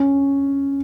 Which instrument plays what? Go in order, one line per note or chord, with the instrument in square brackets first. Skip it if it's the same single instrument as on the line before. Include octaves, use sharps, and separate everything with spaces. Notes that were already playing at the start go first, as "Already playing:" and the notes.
Already playing: [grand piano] C#4